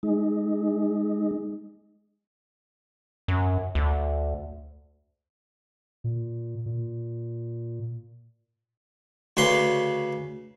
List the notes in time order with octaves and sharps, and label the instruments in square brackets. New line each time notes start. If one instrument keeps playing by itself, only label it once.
[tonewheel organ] G#3 D#4
[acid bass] F#2
D2
[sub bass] A#2
A#2
[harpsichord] D2 C#3 B4 C6